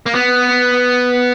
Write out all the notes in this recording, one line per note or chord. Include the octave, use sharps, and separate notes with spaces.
A#3
B3